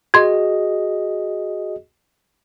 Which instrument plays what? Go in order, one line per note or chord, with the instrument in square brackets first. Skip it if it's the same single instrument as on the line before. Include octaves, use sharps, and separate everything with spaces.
[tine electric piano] F#4 G#4 D#5 [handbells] C6 G#6